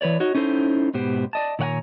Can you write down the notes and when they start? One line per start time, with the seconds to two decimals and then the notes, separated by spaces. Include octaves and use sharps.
0.01 E3 B4 C#5 D5
0.20 D#4 F#4 C#5 D#5
0.35 C#4 D#4 E4 A4 C5
0.94 G#2 B2 B3 G4 C5
1.33 D5 D#5 A5
1.59 A#2 D#3 C#5 F#5 G#5 A#5